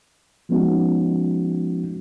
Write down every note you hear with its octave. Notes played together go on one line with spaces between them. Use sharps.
F3 G#3 B3 C#4 D#4 F#4